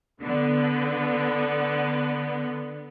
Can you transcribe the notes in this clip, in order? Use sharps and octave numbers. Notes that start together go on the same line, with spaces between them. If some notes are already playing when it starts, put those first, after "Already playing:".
D3 B3